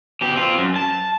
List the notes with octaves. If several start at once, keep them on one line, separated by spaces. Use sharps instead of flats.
B2 G4
C4 F4
F#2
A5